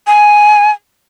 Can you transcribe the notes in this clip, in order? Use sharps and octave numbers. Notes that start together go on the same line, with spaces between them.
G#5